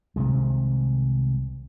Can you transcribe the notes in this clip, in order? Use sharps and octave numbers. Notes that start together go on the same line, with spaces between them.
C2 C3 D#3 G#3